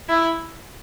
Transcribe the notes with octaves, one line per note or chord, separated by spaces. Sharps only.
E4